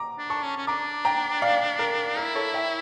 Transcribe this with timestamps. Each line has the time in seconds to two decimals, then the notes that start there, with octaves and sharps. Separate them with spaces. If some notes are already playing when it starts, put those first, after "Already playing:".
Already playing: A#5 D6
0.18 D4
0.30 A5 C#6
0.43 C#4
0.57 C#4
0.67 D4 A#5 D6
1.05 G5 A#5
1.42 D5 F5
1.79 A#4
2.17 E4 A#4
2.35 A4 C#5
2.54 E5 G5